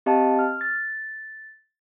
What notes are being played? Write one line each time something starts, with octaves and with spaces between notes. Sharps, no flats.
C4 G4 D#5 F5 A5
F6
A6